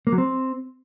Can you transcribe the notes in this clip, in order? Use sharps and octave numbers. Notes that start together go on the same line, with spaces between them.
A#3
F#3
C4